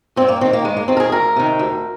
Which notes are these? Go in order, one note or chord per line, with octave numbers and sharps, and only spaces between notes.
G2 C4
A#3
D#3 C4
A#3
G2 G#3
A#3
D#3 C4
A#4
G#4
D2 A#4
C3 D#3
D2